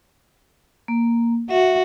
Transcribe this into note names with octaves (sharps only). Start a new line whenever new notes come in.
A#3
F#4 E5